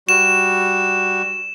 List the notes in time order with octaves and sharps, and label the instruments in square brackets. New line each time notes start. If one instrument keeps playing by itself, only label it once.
[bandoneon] G3 F#4 [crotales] E7